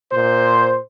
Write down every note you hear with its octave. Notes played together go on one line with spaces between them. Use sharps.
A#2 C5